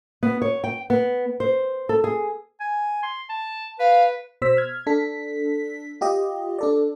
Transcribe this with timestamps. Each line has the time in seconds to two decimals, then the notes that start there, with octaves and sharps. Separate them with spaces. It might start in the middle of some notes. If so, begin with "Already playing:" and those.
0.23 B3
0.42 C#5
0.64 G5
0.90 B3
1.40 C5
1.89 A4
2.04 G#4
2.60 G#5
3.03 C6
3.29 A5
3.79 B4 F5
4.42 B2 C5 E6 B6
4.57 F6 G#6
4.87 D4 A4 B6
6.01 F4 G4 D#5
6.59 D4 A4 D5